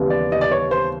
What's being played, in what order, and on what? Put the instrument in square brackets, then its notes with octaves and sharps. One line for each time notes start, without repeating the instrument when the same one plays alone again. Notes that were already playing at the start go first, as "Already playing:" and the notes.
Already playing: [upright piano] D#2 C#3 E3 G3 B3
[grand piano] D5
D#5
D5
C#5
C5